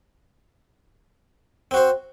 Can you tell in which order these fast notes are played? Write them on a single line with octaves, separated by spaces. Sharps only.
C4 F#4 C5